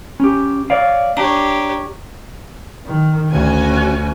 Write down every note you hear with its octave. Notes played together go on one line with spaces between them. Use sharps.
C#4 G4
C#5 D5 F5
D4 G4 C#5 A#5
D#3
D2 C#4 F#4 G#5